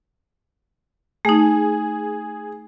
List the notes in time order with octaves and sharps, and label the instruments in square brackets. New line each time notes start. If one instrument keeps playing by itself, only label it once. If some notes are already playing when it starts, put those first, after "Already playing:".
[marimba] A3 D#4 [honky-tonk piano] G#4